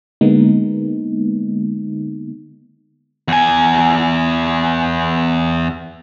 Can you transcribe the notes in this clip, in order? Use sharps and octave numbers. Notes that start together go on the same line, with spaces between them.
D3 G#3 A#3 B3 D#4
E2 G#5